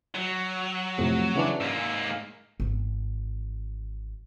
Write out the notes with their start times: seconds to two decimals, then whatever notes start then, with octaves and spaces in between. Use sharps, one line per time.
0.15 F#3
0.98 F2 A2 C3
1.35 C#3 E3 D4
1.60 G#2 A#3 E6
2.60 G#1 E3